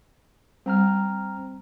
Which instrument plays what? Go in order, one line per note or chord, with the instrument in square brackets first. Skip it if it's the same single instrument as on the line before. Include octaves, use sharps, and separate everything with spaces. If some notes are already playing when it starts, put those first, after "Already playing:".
[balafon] G3 [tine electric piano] C4 A#5 F6